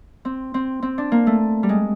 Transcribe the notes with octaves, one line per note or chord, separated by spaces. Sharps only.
C4
C4
C4
D4
A#3
A3
G3
G#3